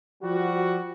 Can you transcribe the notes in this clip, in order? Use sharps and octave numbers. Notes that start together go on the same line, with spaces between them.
F3 G3 F#4